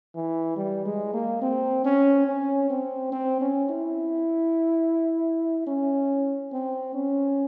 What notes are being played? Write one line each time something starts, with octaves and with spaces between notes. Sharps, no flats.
E3
G3
G#3
A#3
C4
C#4
C#4
C4
C4
C#4
E4
C#4
C4
C#4